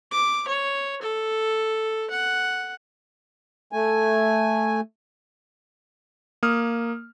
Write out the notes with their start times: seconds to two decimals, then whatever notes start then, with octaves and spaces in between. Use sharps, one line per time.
0.11 D6
0.48 C#5
1.02 A4
2.10 F#5
3.72 A3 G#5
6.43 A#3 D#6 F6